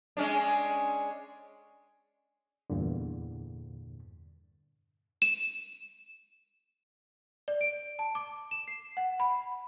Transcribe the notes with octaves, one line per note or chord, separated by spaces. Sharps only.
G#3 C#4 D4
E2 G2 A#2 D3
E7
D5
D7
A5
D6
E7
C7
F#5
B5